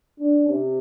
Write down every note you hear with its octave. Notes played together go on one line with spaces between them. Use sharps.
D4
C3